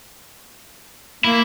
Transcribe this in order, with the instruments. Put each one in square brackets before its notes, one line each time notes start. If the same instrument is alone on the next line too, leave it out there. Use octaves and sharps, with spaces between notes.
[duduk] A#3 [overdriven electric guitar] E4